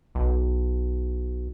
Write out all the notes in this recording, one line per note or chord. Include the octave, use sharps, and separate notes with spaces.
B1